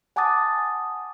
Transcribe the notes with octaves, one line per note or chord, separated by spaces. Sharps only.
F#5 G#5 A5 D6 D#6 A6